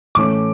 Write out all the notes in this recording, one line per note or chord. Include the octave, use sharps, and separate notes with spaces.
A2 E3 A3 C#4 D6